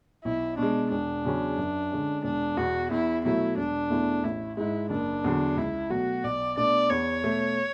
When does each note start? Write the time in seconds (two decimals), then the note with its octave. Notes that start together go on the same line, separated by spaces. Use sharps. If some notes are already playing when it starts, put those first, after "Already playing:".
0.24 B1 E4
0.58 B2 G#3 D4
0.91 E1 D4
1.25 E2 C#3 F#3 C#4
1.58 F#2
1.91 D3 G#3 C#4
2.24 E1 D4
2.57 E2 B2 F#4
2.91 E2 E4
3.24 B2 F#3 A3 E4
3.57 E1 D4
3.90 E2 B2 A3 E4
4.24 A1 E4
4.57 G#2 G#3 E4
4.90 F#1 D4
5.24 E2 D3 F#3
5.57 C#2 E4
5.90 B2 F#3 A3 F#4
6.24 B1 D5
6.57 B2 A3 D4 D5
6.90 E2 C#5
7.23 B2 A3